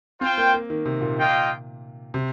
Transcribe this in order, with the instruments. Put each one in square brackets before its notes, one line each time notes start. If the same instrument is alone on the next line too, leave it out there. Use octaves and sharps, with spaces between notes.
[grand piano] C4 [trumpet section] F4 C5 G5
[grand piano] A#3
A#3
D#3
C3
A#2
[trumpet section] A#3 F4 D#5 G5
[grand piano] C3